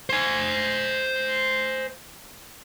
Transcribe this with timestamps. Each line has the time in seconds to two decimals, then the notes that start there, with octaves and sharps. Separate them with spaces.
0.10 C5 G#5